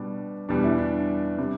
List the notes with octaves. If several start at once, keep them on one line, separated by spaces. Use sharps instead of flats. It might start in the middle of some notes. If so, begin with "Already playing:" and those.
Already playing: B2 G3 D4
E2 B2 G3 D4
E4
D4
C3 G3